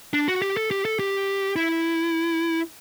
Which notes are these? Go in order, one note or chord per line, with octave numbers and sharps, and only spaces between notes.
D4
F#4
G4
A4
G4
A4
G4
E4